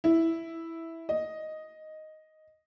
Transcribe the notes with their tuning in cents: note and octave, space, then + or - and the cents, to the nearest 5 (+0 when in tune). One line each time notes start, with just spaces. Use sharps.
E4 -5
D#5 +0